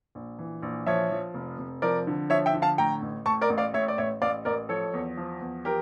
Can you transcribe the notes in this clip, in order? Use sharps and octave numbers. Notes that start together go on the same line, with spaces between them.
A#1
E3
A#1
F3 C#5 E5
F3
F1
F1
F3 A#4 D5
D3
F3 C#5 E5
E5 G5
D3
F5 A5
A2 G5 A#5
A1
A2 A5 C#6
A#4 D5
A1
D5 F5
A2 C#5 E5
D5
A1 C#5 E5
A1 D5 F5
A1 A#4 D5
F3 A4 C#5
E2
F3
E2
F3 G4 A#4